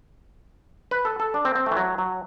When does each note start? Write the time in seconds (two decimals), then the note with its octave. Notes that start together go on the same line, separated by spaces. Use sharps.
0.91 B4
1.05 A4
1.20 A4
1.34 D4
1.45 C4
1.55 C4
1.66 A3
1.71 E3
1.77 F#3
1.98 F#3